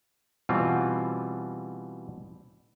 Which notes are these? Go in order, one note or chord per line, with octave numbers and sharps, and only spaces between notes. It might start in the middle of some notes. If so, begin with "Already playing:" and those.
B2 E3 G3 C4 F4